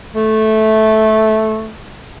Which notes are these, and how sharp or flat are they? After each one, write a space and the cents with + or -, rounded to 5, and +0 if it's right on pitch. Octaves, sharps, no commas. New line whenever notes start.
A3 -10